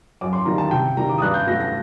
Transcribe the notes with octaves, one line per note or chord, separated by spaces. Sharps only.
F#2 D6
C6
D#3 G3 A#5
A5
C3 G5
D#3 G3 A#5
D6
D#6
G2 F#6
G6
F#3 A3 A#6
A#6